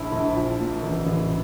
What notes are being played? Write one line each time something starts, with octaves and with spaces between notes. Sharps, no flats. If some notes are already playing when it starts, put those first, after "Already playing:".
Already playing: A#1 E4
A#1
F3
A#2
A1
A1